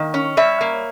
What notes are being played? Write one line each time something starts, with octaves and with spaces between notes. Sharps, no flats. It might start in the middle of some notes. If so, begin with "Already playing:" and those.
Already playing: D#3 A#3
C#4
G3 C#5 E5
A#3